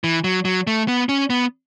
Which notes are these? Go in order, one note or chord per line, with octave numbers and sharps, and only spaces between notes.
E3
F#3
F#3
A3
B3
C#4
B3